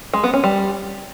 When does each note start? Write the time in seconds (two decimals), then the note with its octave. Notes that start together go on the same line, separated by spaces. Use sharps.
0.13 G#3
0.24 B3
0.34 C#4
0.44 G3